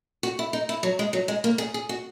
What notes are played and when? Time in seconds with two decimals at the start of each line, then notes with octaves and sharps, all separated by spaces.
0.23 F#4
0.39 E4
0.53 D#4
0.69 E4
0.83 F#3
0.99 G#3
1.13 F#3
1.28 G#3
1.44 A#3
1.58 G#4
1.74 G#4
1.89 F#4